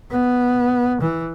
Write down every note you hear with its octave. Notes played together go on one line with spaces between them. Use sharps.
B3
E3